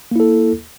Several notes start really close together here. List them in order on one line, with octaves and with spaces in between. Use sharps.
A#3 E4 A4